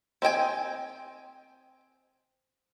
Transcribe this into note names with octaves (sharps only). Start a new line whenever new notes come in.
C4 D#5 G5 G#5